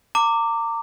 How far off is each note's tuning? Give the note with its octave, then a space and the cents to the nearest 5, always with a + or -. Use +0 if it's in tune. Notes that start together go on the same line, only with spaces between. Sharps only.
A#5 -35 D6 +0